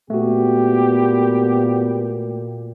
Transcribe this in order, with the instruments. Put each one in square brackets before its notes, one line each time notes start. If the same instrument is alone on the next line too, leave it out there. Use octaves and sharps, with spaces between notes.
[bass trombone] A#2 [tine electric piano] A3 F#4 [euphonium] B3 [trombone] G4